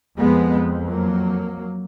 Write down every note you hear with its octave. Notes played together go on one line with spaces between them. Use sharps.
F2 G#3 B3
F#3 A#3